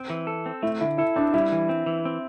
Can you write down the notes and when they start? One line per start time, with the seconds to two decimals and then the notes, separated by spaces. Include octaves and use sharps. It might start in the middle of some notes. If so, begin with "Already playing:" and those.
Already playing: C4
0.10 E3
0.27 A4
0.46 C4
0.63 A3 E4
0.80 D3 E4
0.98 E4 A4
1.16 C4 D4
1.34 G3 E4
1.52 E3
1.69 C4
1.86 E3
2.05 C4